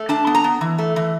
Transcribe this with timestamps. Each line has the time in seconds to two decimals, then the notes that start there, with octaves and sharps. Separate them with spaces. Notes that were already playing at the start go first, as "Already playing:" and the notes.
Already playing: A3
0.09 D4 A5
0.27 B3
0.35 A#5
0.44 B3
0.61 E3
0.78 A3
0.96 E3